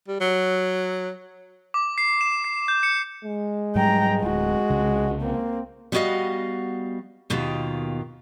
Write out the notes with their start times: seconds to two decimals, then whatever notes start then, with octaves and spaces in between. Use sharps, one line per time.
0.08 G3
0.20 F#3
1.74 D6
1.98 C7
2.21 E7
2.44 C7
2.68 G6
2.83 C#7
3.25 G#3
3.76 G#2 F#3 G3 G5 A#5
4.22 D1 F#4
4.70 C2 C#3
5.21 A#3 C4
5.92 G3 B3 E4 F#4 D#5 F5
7.30 D#2 B2 D#3 F4 G4